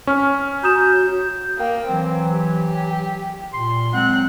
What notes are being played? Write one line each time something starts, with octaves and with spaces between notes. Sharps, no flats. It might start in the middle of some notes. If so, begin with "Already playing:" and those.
C#4 C#6 F6
F#4 A#5 D#6 G6 E7
A#3 G5
E3 F#3 C4
G4
A#2 C6
F#3 G#3 C4 F#5 F#6